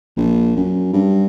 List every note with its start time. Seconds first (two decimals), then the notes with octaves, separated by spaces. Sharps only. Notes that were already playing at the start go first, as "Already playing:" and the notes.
0.17 A#1
0.56 F#2
0.93 G2